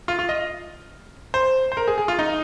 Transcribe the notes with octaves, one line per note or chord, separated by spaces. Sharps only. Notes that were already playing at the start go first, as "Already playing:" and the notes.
F4
F4
D#5
C5
C5
A#4
G#4
G#4
F4
D#4